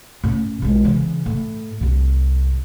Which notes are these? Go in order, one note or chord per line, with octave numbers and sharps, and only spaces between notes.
A2 C#4
B1 G#3
C#3 E3
A2
C2 A2